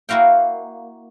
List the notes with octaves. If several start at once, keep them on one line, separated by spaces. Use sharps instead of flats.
A#3 E4 F#4 F5 G5